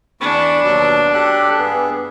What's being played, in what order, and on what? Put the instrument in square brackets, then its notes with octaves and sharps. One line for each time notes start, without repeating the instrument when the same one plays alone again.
[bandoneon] E2 B5 C#6 [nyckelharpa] D4
[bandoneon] D#2 B2 F#3
G4 A4 F#6
G2 B3 G#4